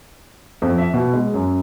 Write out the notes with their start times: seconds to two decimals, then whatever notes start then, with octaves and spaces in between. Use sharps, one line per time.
0.62 F2
0.78 E5
0.94 B2
1.13 G#3
1.34 F#2